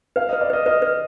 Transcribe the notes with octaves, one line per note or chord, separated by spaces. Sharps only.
B4 F5
B4 D#5
D5
B4 D#5
B4 D#5
B4